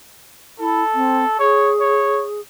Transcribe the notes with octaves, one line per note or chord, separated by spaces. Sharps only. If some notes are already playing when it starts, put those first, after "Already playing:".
E4 A4
C4
G#4 C#5
C#5